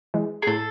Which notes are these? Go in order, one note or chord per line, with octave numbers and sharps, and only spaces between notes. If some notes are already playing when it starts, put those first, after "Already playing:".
E3 G#3
G#4
A2 A4